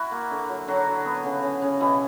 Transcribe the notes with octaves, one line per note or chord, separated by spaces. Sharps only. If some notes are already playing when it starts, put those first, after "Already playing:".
Already playing: E4 F#4
A#3
D3
F#3
D3 F#3 F#4
D3
B3
C#3
C#3
C#3
B2 E3 E4